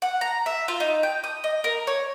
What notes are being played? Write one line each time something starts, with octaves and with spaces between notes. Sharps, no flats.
F#5
A#5
E5
F4
D#4
G5
D#6
D#5
A#4
C#5